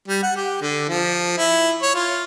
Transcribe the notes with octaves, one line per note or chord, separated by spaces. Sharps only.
G3
F#5
G4
D3
F3
E4
C#5
F4